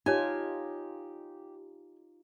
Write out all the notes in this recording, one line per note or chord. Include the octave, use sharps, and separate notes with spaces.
D#4 F4 G4 C#5 G#5 A5